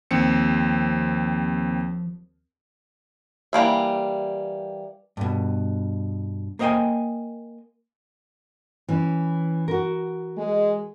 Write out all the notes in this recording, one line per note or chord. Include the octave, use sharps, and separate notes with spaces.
D#2 F3 C4 C#7
E3 G3 A#3 E5
G2 B2
A#3 C5 D#5 F5 G5 G#5
E3 C#4
F#4 A#4
G#3